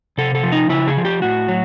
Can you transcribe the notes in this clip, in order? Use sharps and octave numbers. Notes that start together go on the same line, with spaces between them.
C3 A4
A4
F3
D#4
C#3 E4
G#4
F3
G4
A2 F#4
F#3